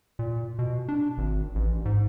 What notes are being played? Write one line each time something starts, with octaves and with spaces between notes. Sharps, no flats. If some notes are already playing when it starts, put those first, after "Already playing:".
A#2
B2
D4
G#1
A1
G#2